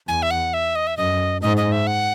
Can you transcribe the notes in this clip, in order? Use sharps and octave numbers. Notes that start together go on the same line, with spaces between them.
E2 G#5
E5
F#5
E5
D#5
E5
F#2 D#5
G#2 D#5
D#5
E5
F#5